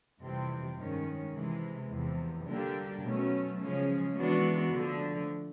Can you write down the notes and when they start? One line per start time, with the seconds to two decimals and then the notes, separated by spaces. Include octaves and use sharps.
0.19 F2 C3 E3 G3 C4
0.76 G2 D#3 G#3 C#4
1.33 C3 E3 G#3
1.90 E2 C3 F3
2.46 D3 G3 A#3 D4 G4
3.02 B2 F#3 A3 C#4
3.60 C#3 F3 G#3 C#4
4.16 E3 G#3 B3 D4 F#4
4.73 D3 F3 A3